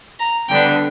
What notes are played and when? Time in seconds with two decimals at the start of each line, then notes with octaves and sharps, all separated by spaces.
0.20 A#5
0.49 D3 G3 B3 D4 G5